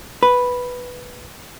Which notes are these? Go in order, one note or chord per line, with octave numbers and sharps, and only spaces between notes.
B4